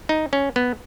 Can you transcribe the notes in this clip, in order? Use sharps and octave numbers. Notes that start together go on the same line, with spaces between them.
D#4
C#4
B3